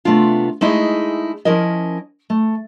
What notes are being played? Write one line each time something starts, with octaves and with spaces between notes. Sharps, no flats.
C3 A3 B3 D4 F4
G#3 A3 D#4 E4 G#4 D#5
F3 C#4 E4 A#4 D#5
A3